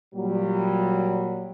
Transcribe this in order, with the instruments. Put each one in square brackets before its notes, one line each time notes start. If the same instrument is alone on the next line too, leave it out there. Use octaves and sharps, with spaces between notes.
[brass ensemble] A#2 F#3 G3